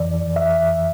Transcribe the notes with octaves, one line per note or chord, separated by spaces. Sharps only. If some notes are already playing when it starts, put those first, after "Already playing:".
Already playing: F2 E3 D5
E5